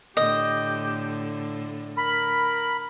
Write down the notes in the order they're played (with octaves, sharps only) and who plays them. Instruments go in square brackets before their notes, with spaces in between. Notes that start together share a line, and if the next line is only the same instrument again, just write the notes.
[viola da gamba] A2 D3 [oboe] G4 [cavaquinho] D#5
[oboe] A#4 [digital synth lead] B5